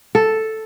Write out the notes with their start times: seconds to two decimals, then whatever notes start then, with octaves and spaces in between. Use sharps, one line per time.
0.15 A4